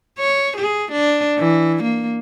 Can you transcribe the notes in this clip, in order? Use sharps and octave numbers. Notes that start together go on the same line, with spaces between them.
C#5
G#4
D4
E3
A#3